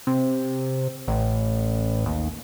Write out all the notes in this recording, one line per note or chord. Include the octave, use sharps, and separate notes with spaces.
C3
A1
D#2